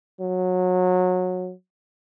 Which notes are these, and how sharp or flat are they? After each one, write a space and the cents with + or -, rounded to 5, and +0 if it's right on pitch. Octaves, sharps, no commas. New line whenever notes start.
F#3 -20